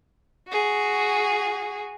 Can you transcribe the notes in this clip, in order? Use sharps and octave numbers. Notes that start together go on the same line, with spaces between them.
F#4 G#4